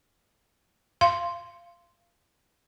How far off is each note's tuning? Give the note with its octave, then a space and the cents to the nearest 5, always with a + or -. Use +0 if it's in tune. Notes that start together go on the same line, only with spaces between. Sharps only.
F5 -25 C6 +0